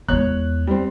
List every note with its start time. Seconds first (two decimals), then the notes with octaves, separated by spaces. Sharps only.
0.08 E2 G#3 C#5 F#6
0.67 G3 C4